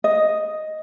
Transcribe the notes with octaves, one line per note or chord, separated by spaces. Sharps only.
D#5